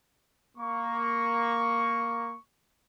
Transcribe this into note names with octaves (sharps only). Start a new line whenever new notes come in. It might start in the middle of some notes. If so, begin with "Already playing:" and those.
A#3 C#6